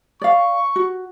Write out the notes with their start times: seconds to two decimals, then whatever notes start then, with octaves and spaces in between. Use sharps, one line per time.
0.21 D5 F5 C#6
0.76 F#4